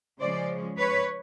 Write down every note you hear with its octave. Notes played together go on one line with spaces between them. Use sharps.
C#3 F3 G#3 C#4 C5 D5
B4 C#5